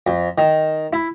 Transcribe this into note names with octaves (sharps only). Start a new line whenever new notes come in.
F2
D#3
E4